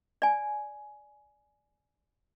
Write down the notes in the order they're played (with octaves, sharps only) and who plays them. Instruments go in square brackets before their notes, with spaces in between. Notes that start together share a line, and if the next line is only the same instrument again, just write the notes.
[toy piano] D5 G#5